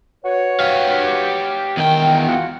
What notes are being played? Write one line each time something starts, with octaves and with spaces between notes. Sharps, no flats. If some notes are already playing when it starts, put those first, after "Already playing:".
F#4 B4 C#5
G4 F5
E2 D#3 G5
F4 F#4 F#5